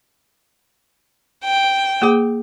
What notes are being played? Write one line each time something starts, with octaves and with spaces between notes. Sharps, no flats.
G5
A#3 G#4 D6